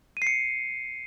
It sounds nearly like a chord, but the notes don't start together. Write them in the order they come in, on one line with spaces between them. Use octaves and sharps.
D#7 C7 C#7